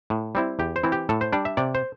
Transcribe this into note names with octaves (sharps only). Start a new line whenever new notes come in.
A2
G3 C4 E4
E2 G4
C5
E3 C4 E4
G4
A2 A4
C5
G3 D4 D5
E5
C3 D5
C5